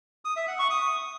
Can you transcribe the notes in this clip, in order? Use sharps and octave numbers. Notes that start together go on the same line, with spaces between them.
D#6
E5
F#5
C#6
D#6